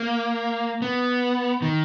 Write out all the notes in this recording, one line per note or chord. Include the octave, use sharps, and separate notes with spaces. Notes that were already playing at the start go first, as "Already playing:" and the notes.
Already playing: A#3
B3
D#3